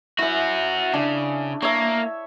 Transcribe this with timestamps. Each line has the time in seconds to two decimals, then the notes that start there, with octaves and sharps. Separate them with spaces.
0.19 C#4 E4 F#4 E5
0.94 C#3 D4
1.62 A#3 C#5 E5